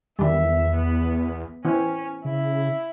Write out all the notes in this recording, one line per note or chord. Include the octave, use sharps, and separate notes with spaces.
E2 D#3 G3 E5
B3
E3 C4 C#4
C#3 E4